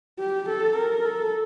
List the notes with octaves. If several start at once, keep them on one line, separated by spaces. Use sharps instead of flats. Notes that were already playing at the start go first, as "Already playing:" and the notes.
G4
A4
A#4
A4